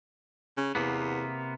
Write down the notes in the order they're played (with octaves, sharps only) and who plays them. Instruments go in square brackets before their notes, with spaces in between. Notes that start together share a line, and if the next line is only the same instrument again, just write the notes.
[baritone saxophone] C#3
[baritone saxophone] E2 [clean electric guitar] C3 A#3 B3